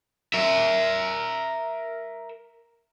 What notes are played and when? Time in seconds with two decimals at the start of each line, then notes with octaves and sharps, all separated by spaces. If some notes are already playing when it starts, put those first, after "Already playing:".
0.34 A#4 E5